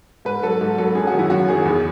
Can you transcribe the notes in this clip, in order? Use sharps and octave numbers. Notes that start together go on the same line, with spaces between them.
G#2 B4
F#3 A4
G#2
F#3 A4
F#2 G#4
F#4
D#3 F#3
E4
F#2 F#4
D#3 F#3 G#4
E2